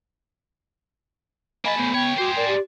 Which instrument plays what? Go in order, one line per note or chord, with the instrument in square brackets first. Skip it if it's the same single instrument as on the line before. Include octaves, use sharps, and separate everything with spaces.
[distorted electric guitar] A#3 A5 [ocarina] D#5 [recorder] G#5 [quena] B5
[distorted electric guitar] A3 C5 [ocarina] B3
[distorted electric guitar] C#2 C#5 [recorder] G5
[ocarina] F#4 [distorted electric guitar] G#4 C5 [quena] D6
[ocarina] A#4 [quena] D5
[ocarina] G4